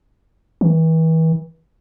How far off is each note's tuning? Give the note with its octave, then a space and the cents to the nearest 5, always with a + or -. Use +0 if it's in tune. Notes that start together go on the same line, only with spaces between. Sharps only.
E3 -35